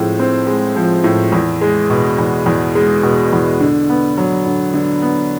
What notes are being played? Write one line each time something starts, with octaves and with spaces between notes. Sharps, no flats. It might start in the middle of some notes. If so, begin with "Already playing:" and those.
Already playing: A2 F3 G#3 C4
C4
G#3
F3
A2
E2
G#3
B2
E2
E2
G#3
B2
E2
D3
B3
F#3
D3
D3
B3